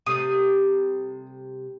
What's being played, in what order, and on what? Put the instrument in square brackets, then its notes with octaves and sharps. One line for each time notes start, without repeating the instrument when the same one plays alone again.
[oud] C3 G3 A3 [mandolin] D#6